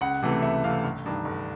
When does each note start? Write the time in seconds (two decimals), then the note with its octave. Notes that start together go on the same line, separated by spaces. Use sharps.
0.01 C#2 F#5
0.22 C3 E3 A3
0.43 C#2 E5
0.64 C3 E3 A3 F5
0.84 G1
1.06 G2 D#3
1.25 G1